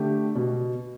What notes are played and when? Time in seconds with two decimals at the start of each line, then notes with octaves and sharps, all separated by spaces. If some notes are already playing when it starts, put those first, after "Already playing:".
Already playing: D3 A3 G4
0.35 B2